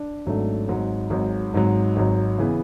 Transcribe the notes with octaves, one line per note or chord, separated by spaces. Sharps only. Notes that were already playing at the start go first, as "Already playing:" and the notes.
Already playing: D4
G#1 G#2 F#3 A3 D4
G#1 G#2 F#3
G#1 G#2 F#3
G#1 G#2 F#3
G#1 G#2 F#3
C#3 E3 B3